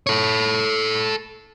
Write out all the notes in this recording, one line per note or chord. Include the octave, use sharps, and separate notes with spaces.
A4 C#5